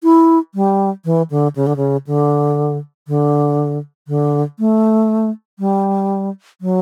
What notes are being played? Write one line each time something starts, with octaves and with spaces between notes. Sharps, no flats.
E4
G3
E3
D3
C#3
D3
C#3
D3
D3
D3
A3
G3
F#3